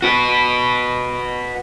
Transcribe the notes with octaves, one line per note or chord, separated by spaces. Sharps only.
F#4 B4